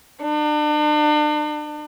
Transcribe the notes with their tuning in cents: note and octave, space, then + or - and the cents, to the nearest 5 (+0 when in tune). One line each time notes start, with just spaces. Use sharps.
D4 +40